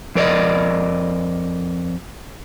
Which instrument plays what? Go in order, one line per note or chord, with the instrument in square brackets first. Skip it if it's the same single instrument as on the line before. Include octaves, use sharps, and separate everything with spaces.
[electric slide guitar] F2 A#4 D5 D#5